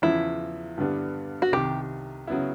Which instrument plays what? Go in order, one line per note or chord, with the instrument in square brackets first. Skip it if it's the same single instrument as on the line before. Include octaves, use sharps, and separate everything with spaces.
[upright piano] E2 C#3 F3 [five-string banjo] E4
[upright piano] G2 D3 G3 B3 D4
[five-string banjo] F#4
[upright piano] C2 C3 D#3 [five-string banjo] G4
[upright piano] C#3 F#3 B3 E4